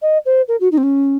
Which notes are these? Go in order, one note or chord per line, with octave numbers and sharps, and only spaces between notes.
D#5
C5
A#4
F#4
D#4
C4
C#4